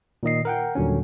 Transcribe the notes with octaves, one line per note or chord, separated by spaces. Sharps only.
A#2 D#3 D#5 C7
A#4 F#5 G5
D#2 A#2 D3 F#3 G3 C#4